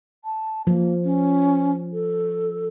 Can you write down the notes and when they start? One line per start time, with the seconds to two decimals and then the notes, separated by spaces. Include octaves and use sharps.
0.25 A5
0.67 F3 A#3
1.04 C#4
1.93 A4